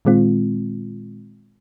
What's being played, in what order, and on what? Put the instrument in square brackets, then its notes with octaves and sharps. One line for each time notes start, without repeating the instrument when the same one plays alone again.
[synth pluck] A#2 D#3 G#3 C4 F4